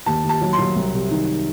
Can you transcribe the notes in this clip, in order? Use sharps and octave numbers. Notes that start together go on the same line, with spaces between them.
D#2 A5
D#2
A5
F#3
C6
F#3
C2
C3
D#3